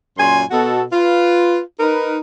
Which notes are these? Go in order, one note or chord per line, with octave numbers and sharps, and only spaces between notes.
F#2 A#2 G#5 C6
B2 F#4 A4
F4 B4
D#4 A#4 B4